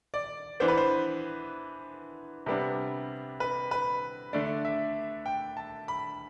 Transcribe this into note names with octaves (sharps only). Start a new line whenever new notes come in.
D5
E3 B3 D4 C5
B4
C5
C3 G3 B3 D4
B4
B4
D3 A3 D4 D5
E5
G5
A5
B5